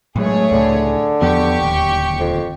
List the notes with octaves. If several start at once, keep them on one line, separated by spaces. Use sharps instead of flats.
A2 F#3 G#3 A3 G#4 C#5
C#2 A2 D3
E2 F3 B3 G4 C#6
D1 G1 D#2
F2